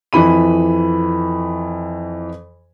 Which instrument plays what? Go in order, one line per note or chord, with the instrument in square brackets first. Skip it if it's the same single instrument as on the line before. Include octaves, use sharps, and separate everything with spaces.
[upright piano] F2 E3 B5 D#7